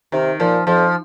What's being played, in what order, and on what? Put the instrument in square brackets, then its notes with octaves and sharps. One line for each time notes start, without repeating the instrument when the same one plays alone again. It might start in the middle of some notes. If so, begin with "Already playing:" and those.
[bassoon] C3 [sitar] D#3
[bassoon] A#2 [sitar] F3
[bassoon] F2 [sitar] F3